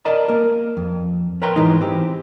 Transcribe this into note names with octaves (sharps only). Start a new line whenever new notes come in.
A#4 D5 D#5 A5 A#5
A#3 A#4
F2
A#4 B4 C#5 G5 A#5 C6
G#2 E3 G#3 B3 D#4
C4 G4